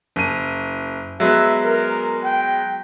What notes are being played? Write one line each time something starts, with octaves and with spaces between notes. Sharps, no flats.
F#1 D#7
F#3 G#3 B3 E5
A#4
G5